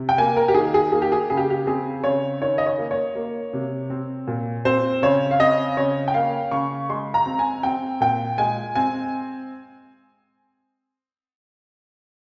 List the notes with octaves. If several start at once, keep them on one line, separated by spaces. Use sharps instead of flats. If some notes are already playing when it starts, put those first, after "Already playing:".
Already playing: C3
G5
A#3 G#5
A#4
G4
D#3 G#4
G#4
A#3 G#4
G4
G#4
C#3 G#4
G4
G4
C4 G#4
C#3 C#5
D#3 C#5
D#5
C#5
A#3
C#5
A#3
C3
C4
A#2
C4 C5
C#3 C#5
F5
C4 D#5
C#3 C#5
G5
A#3 F5
C#3 C#6
G#3 C6
A#5
C4
G#5
C4 G5
A#2 G5
G#3 G#5
C4 G#5